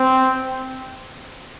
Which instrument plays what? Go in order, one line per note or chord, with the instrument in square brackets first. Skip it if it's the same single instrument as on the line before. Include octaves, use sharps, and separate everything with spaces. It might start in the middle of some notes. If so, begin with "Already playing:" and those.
Already playing: [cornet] C4